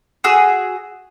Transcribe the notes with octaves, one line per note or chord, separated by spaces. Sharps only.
F#4 G#4 E6